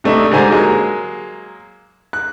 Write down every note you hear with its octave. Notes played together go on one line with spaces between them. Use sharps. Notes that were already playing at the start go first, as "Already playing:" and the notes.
C3 A3 D4 D#4
G#2 D3 G3 C5 G#5 A#5
F#3 G#3 A#3
F#6